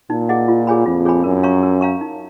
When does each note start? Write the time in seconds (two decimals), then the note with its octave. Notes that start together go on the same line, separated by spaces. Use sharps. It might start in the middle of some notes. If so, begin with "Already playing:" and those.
0.10 A#2 D#4
0.29 G#4 D#5 F#5
0.48 F4
0.67 G#4 C#5 G#5 B5
0.86 F2 F4
1.05 G#4 C#5 G#5 B5
1.24 F#2 A#4
1.43 C#5 F5 A#5 C#6
1.63 A#4
1.81 C#5 F5 A#5 C#6
2.01 D#4